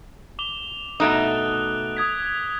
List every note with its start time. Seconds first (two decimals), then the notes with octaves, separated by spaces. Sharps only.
0.39 D6 F7 G7
1.00 B2 A3 D#4 D#6 F#6 D7
1.97 D#6 G#6 B6